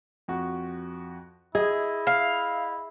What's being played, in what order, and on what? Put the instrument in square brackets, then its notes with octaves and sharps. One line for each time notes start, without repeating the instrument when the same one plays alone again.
[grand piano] F2 F#4
[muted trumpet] E4 [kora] G#4 [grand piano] D#5
[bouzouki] F5